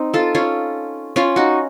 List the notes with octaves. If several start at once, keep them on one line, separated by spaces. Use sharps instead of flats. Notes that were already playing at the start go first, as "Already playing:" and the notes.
Already playing: C4 D#4
F4 A4
C#4 F4
C#4 F4
D#4 F#4